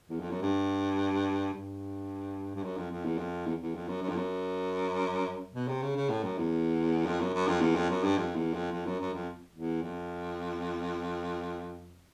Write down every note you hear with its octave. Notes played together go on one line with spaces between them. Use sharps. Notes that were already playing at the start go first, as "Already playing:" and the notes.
E2
F2
F#2
G2
G2
G2
F#2
F2
F2
E2
F2
E2
E2
F2
F#2
F#2
F2
F#2
B2
C3
C#3
C#3
A2
F#2
E2
F2
F#2
F#2
F2
E2
F2
F#2
G2
F2
E2
F2
F2
F#2
F#2
F2
E2
F2